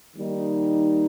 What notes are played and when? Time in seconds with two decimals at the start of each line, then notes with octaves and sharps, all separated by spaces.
0.17 D#3 G3 A#3 D#4